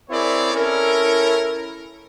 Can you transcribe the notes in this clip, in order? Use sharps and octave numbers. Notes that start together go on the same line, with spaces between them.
C4 E4 G#4 A#4 C#5 D5
C#4 E4 A4 A#4